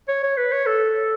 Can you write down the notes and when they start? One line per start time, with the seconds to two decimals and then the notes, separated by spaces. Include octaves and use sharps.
0.08 C#5
0.23 C#5
0.37 B4
0.52 C#5
0.66 A4